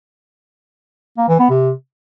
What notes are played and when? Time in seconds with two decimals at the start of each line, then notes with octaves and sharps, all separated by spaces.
1.18 A#3
1.29 E3
1.39 B3
1.50 C3